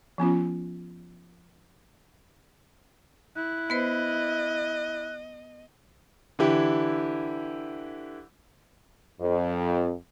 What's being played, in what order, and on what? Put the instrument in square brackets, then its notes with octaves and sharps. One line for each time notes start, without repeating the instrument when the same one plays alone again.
[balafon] F3 B3 C#4 F4
[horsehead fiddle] E4 [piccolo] F#6
[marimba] B3 B4 C5 [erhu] D#5
[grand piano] D3 E3 E4 G4
[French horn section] F2